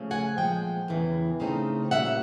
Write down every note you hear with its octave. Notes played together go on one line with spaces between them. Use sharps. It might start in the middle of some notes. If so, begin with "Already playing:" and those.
Already playing: C#3 F3 A3
F#5 G#5
A#2 F3 G#3 G5
E2 C#3 E3
C#3 F3 A3 C4 D#4
A#2 G3 A#3 C#4 E5 F#5